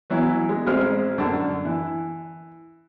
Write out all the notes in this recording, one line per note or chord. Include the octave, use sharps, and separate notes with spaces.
E3 F#3 B3
G#3
A1 G#3 C4 F6
F#2 D3 A5
E3